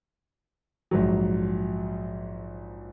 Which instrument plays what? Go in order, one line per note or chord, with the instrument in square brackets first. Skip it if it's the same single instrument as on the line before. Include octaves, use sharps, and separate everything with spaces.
[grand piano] A#1 G#2 F#3